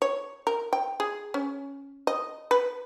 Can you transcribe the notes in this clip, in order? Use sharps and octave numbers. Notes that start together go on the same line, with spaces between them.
C#5
A#4
G5
G#4
C#4
D#5
B4